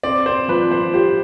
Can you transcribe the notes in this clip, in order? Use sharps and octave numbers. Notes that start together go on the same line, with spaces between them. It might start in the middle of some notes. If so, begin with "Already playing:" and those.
C4 D5
C4 C5
F3 B4
F3 C5
G4 C5